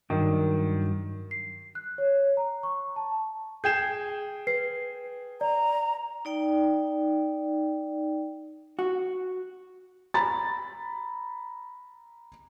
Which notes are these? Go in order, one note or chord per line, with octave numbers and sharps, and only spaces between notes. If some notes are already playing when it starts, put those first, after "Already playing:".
G2 D#3 F#3 D4
C7
F#6
C#5
A#5
C#6
A5
G#4 G5 G6 G#6 C7 E7
B4 C7
D5 A#5
D#4 D5 G5
F#4
A#5 B5 A6